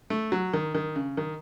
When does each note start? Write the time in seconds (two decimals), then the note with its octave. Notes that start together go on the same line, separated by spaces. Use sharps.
0.10 A3
0.32 F#3
0.53 D#3
0.75 D#3
0.96 C#3
1.17 D#3